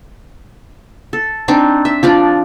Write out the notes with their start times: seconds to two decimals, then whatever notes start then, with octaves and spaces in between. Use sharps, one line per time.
1.13 A4
1.48 C4 D4 D#4
1.85 E5
2.03 F3 D4 D5